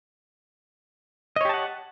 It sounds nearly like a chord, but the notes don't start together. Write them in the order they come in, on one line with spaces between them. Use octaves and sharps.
D#5 C#5 G4 A5 F#5